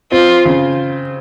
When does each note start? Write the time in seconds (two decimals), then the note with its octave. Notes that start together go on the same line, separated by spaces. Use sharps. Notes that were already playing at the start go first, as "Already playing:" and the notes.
0.11 C4 F4
0.45 C#3